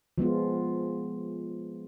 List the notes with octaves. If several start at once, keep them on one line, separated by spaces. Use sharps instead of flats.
F3 G#3 B3 F4